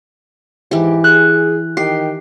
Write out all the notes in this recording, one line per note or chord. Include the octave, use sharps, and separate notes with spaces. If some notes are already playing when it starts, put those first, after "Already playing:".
G#2 E3 G4
G#4 F#6
D#3 G4 C7